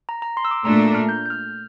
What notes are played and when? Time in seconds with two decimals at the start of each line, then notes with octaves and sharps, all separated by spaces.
0.09 A#5
0.22 A#5
0.37 C6
0.45 E6
0.51 D6
0.65 A#2 A3 D4 A#5
0.80 A#5
0.95 F6
1.09 G6
1.26 G6
1.30 F6